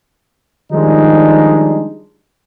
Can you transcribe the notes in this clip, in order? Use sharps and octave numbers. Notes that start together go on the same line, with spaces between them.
D#3 F3 G3 G#3 D4 D#4